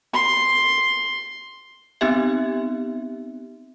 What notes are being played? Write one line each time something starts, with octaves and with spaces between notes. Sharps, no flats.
C6
B3 C4 D#4 G4 E5